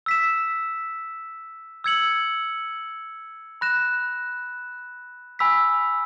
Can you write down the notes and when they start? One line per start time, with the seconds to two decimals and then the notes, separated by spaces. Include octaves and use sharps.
0.06 E6 B6 E7
1.84 E6 G#6 C#7 F#7
3.61 B5 F#6 A#6 E7
5.39 G#5 B5 E6 B6